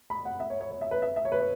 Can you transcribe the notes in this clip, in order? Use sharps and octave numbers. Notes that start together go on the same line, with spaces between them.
B5
F#5
E5
C#5
C#5
C#5
E5
B4
E5
E5
C#5
B4
C#5